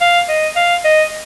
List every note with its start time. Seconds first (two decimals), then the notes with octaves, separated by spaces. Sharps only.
0.01 F5
0.29 D#5
0.56 F5
0.84 D#5